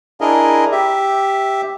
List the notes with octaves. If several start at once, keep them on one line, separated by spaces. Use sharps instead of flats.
D4 E4 G#4 A#4 D#5
G4 E5